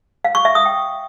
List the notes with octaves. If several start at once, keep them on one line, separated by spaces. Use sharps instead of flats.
F5
C#6
E5
D#6
G5